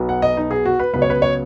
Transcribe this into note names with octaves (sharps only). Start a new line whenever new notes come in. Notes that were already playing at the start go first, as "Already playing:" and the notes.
Already playing: B1 B2 F#3 B3
F#5
D#5
D#4
G#4
F#4
B4
C#2 C#3 F#3 B3 B4
C#5
B4
C#5